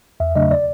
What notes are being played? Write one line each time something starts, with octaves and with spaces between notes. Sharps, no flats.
E2 E5
C#3 F#3 A3 D4 D#5
D5